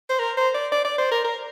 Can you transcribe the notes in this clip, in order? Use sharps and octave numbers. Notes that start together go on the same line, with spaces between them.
C5
A#4
C5
D5
D5
D5
C5
A#4
A#4